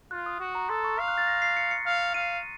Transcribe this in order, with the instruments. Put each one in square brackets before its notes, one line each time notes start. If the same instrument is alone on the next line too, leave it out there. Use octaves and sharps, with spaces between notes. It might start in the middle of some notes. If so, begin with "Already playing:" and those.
[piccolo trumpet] F4 [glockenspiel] F#6
[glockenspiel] D#6
[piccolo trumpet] F#4
[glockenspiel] A#5
[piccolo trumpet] A4 [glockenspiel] C6
[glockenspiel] C#6
[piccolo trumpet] F5 [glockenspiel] F6
[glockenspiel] F#6
A6
A#6
C7
C#7
C#7
[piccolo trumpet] F5
[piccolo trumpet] F5 [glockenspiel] D#7